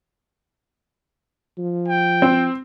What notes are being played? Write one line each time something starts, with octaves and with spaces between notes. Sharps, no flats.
F3
G5
C4